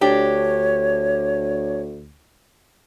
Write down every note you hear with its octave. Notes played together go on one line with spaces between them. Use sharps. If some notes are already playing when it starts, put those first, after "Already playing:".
D2 D4 G4 C#5